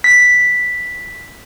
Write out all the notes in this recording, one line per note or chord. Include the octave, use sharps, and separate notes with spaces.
B6